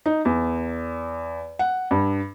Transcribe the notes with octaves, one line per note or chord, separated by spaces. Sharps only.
D#4
E2
F#5
G2